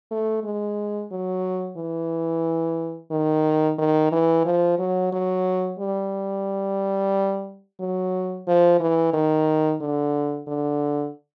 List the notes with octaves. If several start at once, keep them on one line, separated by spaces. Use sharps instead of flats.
A3
G#3
F#3
E3
D#3
D#3
E3
F3
F#3
F#3
G3
F#3
F3
E3
D#3
D3
D3